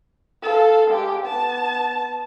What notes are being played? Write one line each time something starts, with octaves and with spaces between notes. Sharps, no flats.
A4 F5
G#3 G4
B3 A5